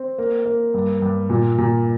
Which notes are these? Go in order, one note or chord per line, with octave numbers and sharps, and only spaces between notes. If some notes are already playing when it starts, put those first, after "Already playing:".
Already playing: C4
A#3
A#3
G2
G2
A#2
A#2